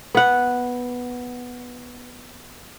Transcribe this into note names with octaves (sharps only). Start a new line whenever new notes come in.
B3 F#5